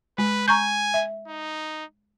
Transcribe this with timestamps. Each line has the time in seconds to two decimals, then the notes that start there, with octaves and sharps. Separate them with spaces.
0.18 G#3 B4
0.48 G#5 A#5 C#6 G6
0.94 E5
1.28 D#4